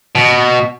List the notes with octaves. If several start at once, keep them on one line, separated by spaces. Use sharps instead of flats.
B2